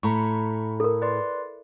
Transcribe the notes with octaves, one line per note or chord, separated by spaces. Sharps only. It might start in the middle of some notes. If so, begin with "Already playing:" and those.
A2 A#5 B5 C#6
A4 A#4
B4 D5 C6